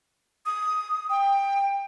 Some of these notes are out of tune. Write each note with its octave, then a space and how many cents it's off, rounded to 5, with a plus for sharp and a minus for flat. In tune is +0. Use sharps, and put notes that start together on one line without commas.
D#6 +10
G5 +20